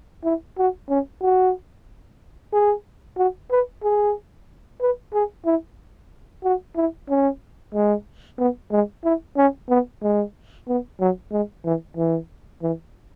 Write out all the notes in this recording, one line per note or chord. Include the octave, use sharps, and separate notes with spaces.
E4
F#4
C#4
F#4
G#4
F#4
B4
G#4
B4
G#4
E4
F#4
E4
C#4
G#3
B3
G#3
E4
C#4
B3
G#3
B3
F#3
G#3
E3
E3
E3